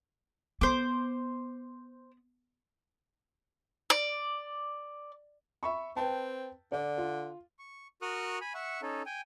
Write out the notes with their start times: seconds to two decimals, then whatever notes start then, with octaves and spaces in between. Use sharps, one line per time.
0.61 B3 C5 D6
3.90 D5
5.63 E5 B5 C#6
5.96 C4 B4 G5 A5
6.72 D3 D5
6.98 F4
7.59 C#6
8.02 F#4 A#4 C#6 D#6 F6 F#6
8.41 G#5 B5
8.54 E5 F#5 C#6
8.82 C#4 D#4 A4
9.06 G5 G#5